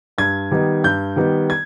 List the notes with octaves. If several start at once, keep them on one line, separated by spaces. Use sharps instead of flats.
G2 G#6
D#3 G3 B3 D#4
G2 G6
D#3 G3 B3 D#4
G#6